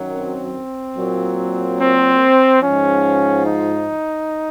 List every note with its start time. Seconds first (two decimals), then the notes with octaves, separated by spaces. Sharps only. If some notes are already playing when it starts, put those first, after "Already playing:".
Already playing: F#2 D#3 F#3
0.14 C4
0.95 A#2 F#3
1.78 C4
2.61 G#2 F3 C#4
3.44 D#4